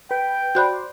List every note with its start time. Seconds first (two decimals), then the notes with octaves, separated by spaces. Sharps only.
0.11 B4 G5
0.55 F#4 C5 D5 B5 F#6 G6